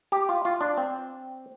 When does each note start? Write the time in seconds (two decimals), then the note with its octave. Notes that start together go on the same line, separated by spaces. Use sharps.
0.12 G4
0.29 F4
0.45 F4
0.61 D4
0.77 C4